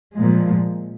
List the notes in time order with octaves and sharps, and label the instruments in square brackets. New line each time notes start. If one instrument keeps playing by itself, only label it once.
[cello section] A#2 F3 G#3